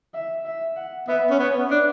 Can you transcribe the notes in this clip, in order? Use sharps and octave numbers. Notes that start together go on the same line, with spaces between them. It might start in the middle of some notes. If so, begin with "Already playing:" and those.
E5
E5
F#5
B3 E5
C#4
B3 C#5
D4